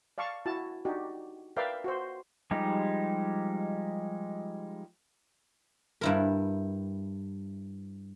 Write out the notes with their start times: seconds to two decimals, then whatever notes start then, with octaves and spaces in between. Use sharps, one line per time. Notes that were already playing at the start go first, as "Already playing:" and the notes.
0.18 D5 F5 A5 C#6
0.46 E4 F#4 A5
0.85 D4 D#4 F#4 G4
1.57 A#4 B4 D5 E5 F5 G5
1.84 F#4 C5
2.51 F3 G3 G#3 D#4 G4
6.01 G2 E4 A#4